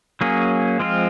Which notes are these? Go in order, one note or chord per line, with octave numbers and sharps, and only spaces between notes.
F#3 A#3 C#4 G#4
F3 G#3 C4 F4